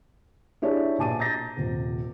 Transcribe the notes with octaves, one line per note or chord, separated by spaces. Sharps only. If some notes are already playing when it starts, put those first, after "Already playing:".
D4 E4 G4 G#4 C#5 D5
A#1 B2 G#5 A5 D6 D#7
A#5 G6 A6 A#6
D#1 C3